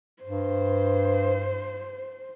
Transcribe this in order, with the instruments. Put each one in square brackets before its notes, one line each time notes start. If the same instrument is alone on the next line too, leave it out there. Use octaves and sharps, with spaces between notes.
[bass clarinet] G2 [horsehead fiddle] C5